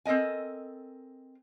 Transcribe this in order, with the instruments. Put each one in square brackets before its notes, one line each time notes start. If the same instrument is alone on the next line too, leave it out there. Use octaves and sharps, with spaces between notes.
[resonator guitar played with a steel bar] C4 A4 A#4 D#5 G#5